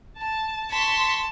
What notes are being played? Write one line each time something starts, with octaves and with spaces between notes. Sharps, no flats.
A5
A5 C6 C#6 B6